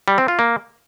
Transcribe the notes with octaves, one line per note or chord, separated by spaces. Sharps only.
G3
C4
F4
A#3